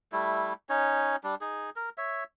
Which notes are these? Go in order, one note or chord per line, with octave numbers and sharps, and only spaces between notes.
G3 A3 E4
C#4 D#4 C#5
G3 D4
D#4 G#4
A#4
C#5 E5